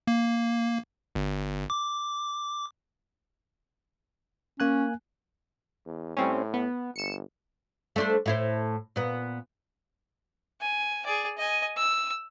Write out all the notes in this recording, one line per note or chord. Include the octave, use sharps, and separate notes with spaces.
A#3
G1
D6
A#3 C#4 G#5 F#6
E2
A2 G3 C4 C#4
B3
G1 C#7 E7
A3 D4 C5
A2 E4 C5
A#2 B3
G#5
G#4 D5
D#5 G#5
E6